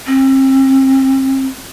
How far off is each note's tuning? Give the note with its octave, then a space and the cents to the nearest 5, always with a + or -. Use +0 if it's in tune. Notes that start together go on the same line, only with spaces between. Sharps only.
C4 +35